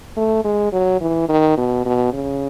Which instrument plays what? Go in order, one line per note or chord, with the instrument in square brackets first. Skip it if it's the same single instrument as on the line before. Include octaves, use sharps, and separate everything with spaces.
[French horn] A3
G#3
F#3
E3
D#3
B2
B2
C#3